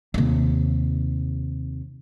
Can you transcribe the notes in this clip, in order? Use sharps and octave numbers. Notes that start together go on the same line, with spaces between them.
D#2 C3